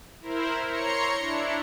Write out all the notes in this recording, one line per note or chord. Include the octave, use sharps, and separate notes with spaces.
E4 A#4 C5
C#5 A#5 C6 C#7
D4 E4